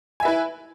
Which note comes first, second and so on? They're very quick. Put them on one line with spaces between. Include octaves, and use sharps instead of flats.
G#5 E5 B4 E4